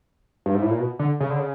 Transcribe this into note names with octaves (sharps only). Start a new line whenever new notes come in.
G2
G#2
A2
A#2
B2
D3
C#3
D3
C#3